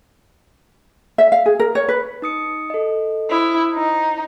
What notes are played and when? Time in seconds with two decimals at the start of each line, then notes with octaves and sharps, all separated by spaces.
1.18 E5
1.32 F5
1.46 G#4
1.60 A#4
1.75 C#5
1.89 B4
2.22 D#4 D#6 C#7
2.70 A4 D#5
3.31 E4 C5 D#6
3.75 D#4